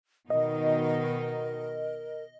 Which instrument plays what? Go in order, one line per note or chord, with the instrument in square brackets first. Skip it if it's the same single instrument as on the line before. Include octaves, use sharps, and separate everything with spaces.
[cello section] B2 D#3 D#4 [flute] A#4 [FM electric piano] D#5